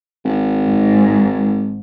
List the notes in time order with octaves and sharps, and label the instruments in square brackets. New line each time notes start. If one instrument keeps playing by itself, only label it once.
[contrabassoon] G#1
[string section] G#2